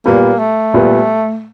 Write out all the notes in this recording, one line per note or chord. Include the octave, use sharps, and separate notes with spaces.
A#2 G3 A#3 B3
A3
A#2 G3 B3